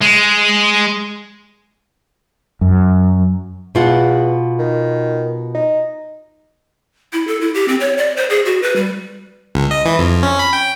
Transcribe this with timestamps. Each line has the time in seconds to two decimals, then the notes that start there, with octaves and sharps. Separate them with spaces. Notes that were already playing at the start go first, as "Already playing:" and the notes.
0.01 G#3
2.61 F#2
3.75 E2 B2 F4 F#5
4.59 D#3
5.55 D#4
7.13 E4
7.27 A4
7.41 E4
7.55 G4
7.68 C4
7.80 C#5
7.97 D5
8.17 C5
8.30 G#4
8.45 F#4
8.63 B4
8.76 G3
9.55 C#2
9.71 D#5
9.85 E3
9.99 F2
10.23 C#4
10.39 B5
10.53 G5